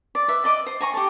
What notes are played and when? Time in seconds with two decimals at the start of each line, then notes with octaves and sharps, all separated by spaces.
0.15 D5
0.28 B4 E5
0.44 D5 D#5 D6
0.66 C5
0.81 G#5 A#5 C#6
0.94 G4 A4